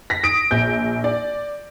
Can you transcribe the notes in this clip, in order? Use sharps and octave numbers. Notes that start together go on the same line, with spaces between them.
A#6 B6
D#6 B6 D7
A#1 G6
D5